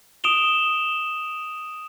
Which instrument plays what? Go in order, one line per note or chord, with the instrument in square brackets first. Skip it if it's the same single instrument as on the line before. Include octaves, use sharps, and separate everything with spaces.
[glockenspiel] D#6 D7 E7 F7 G7